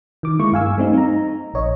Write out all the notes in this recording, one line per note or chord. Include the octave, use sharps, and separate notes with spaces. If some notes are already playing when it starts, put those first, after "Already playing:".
D#3 D6
G#3 A#3 E4 C#6
G2 F5 G#5 E6
G3 A3 C4 D#4
D#4 A#5
A#1 C#5 D#5